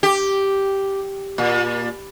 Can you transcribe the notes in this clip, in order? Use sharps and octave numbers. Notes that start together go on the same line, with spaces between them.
G4
A#2